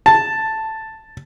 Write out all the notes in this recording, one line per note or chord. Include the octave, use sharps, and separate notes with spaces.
A5